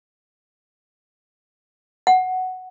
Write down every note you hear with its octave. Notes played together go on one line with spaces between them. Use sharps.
F#5